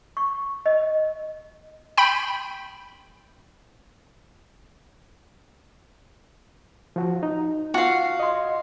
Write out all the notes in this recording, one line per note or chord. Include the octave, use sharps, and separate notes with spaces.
C#6
D#5
G5 B5
F3 F#4
D#4
F4 F#4 F5
D#5 C6